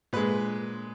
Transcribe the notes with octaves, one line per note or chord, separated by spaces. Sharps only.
A#2 G#3 B4